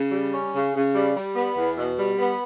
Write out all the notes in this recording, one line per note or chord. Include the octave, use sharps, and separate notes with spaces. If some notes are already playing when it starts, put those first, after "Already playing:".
Already playing: C#3
G3
C#4
C#3
C#3
G3
G3
B3
E2
B2
G3
B3